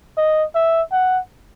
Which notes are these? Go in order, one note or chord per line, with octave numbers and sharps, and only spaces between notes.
D#5
E5
F#5